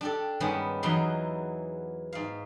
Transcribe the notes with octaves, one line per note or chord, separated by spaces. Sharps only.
D4 G4 A4
G2 D#3 G#3 B3 C#4 B5
E2 E3 F#3 D#4 B5 C6
G#2 F5